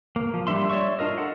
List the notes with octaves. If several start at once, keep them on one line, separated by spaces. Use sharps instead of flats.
A#3
F3
G3 A#3 D4 E5 C6
C#5 D5 E5 C#6
D4 F4 A#4 D#5
A4 F#5